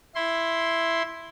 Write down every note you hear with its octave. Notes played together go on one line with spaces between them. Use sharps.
E4 C6